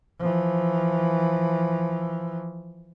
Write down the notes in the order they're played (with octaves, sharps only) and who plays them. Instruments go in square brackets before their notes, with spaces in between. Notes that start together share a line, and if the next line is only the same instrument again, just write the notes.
[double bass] E3 F3